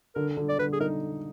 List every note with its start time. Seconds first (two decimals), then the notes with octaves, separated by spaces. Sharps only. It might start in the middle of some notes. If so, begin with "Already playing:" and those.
0.15 D3 A#4
0.37 D3
0.49 D5
0.59 D3 B4
0.73 G#4
0.80 D#4 A#4